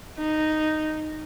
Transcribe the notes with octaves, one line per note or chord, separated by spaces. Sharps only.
D#4